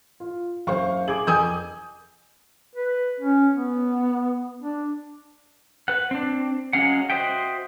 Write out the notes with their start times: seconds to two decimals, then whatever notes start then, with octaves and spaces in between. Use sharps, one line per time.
0.20 F4
0.67 F#1 C5 F5 C#6
1.08 G#4 D6 G#6 F#7
1.27 F2 G#5 D#6 G6
2.76 B4
3.21 C#4
3.54 B3
4.62 D4
5.88 B4 F#5
6.11 C4 D4
6.73 F#3 G#3 C#4 F5 F#5
7.10 F#4 C5 D#5 E5 G5